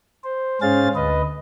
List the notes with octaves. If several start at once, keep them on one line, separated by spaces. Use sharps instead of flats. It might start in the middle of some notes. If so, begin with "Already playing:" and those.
C5
G#2 C#4 G#4 C5 F5 A6
D2 B4 D#5